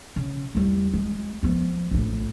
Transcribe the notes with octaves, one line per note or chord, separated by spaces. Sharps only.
C#3
E2 G3
G#3
F3 B3
A#1 A2